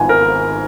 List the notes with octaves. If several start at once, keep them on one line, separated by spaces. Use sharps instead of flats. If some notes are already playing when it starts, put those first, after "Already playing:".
Already playing: G#1 G#2 F3 B3 G#5
A#4